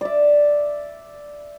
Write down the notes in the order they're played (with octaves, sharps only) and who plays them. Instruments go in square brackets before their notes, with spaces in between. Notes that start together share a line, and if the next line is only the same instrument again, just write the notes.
[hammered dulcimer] D5 E5